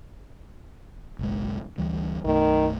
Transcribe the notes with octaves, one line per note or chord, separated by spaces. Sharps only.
F#1 B1 G#3
D2 E3 G3
B1 F#2 D#3 A3